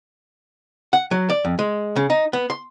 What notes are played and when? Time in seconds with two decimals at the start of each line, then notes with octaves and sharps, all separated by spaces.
0.93 F#5
1.11 F#3
1.30 D5
1.45 F2
1.59 G#3
1.96 C#3
2.10 D#4
2.33 B3
2.50 C6